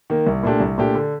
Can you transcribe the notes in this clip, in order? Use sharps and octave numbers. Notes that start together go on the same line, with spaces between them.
D#3 A#3
C2
A#2 A3 D4 G4
C2
A#2 A3 D4 G4
D3